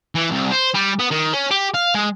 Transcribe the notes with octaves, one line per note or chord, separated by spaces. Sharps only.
E3
C2
C5
G3
B3
D#3
C#4
G4
F5
G#3